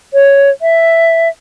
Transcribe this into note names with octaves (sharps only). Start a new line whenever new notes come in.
C#5
E5